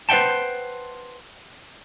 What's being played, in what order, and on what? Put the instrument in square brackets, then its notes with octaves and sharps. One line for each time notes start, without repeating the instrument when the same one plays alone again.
[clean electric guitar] B4 C5 E5 F#5 G5 A5